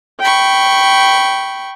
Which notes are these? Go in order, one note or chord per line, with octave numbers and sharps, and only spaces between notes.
G5 B5 C#6